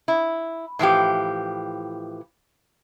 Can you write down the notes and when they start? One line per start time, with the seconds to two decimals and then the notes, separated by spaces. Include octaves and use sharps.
0.08 E4
0.79 A2 E3 F3 G4